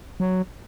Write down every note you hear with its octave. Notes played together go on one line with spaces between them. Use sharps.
F#3